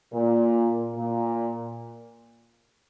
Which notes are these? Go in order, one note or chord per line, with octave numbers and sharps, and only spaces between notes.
A#2
A#2